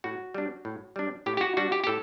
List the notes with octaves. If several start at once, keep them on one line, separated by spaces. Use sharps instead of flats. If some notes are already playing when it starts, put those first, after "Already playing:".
A2 F#4
G3 D4
A2
G3 D4
A2 G4
G4
F#4
G3 D4 F#4
G4
G4
A2 A4